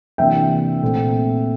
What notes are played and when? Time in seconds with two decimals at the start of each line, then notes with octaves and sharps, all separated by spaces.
0.18 C3 E3 A#3 D4 E5 G5
0.82 A#2 A3 C4